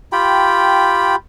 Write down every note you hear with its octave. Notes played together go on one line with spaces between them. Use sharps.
F4 G4 G5 B5